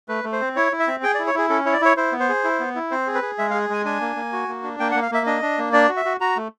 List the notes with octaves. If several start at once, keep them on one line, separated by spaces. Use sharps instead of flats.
A3 B4
A3
C5
C4
E4 C#5
E4
E5
C4
G#4 G5
D5
E4
C#5
E4 G#4
C#4 A4
E4 C#5
D5
E4 C#5
E4 C5
B3
C5
G#4
E4
B3
E4
C4 C5
G#4
B4
G#4
G#3 E5
F5
G#4
G#3 G#5
D4 G#5
A#3
A#3
F#4
A#3
D4
A#3 G5
F#5
A#3
F5
A#3 E5
D4 D#5
D4
A#3
D4 D5
F#4
E5
F#4
F#4 A#5
A3